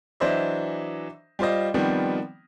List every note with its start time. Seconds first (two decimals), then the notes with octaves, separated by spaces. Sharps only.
0.20 E3 F#3 D4 C5 D#5 E5
1.39 G3 F4 C5 D#5
1.74 D#3 F3 G3 B3 C4